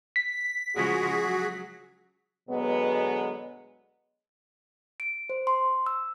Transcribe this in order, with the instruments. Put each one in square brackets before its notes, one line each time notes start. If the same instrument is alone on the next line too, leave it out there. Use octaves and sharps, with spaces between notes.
[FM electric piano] B6
[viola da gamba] C#3 F3 G#3 [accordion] F#4 G#4
[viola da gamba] F#3
[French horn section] D2 B2 F#3 G#3 B3
[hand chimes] D7
C5
C6
E6